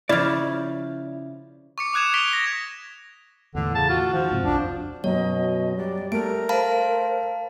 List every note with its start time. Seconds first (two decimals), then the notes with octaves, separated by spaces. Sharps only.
0.09 C#3 F3 E4 D5
1.78 C#6 D6 C#7
1.93 D6 D#6 F#6 G#6 E7 F7
2.14 C#6 G#6 B6 D7 F7 G7
2.33 C#6 A#6
3.55 E2 A2 D3
3.75 C#3 A5
3.89 F4 F#4
4.13 D#3 F3
4.32 G#2 C3
4.43 B1 F2 D4
5.04 F#2 B2 F#3 C#5 D#5
5.77 G3 D5
6.12 A3 A#4 D7
6.49 C5 F5 A5 B5